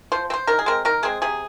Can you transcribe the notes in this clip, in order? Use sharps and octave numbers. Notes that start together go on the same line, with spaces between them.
F3 C5
C4
C5
D#3 A#4
G#4
G#3 C4 A#4
D#3 A#4
G#3 C4 G#4
C3 G#4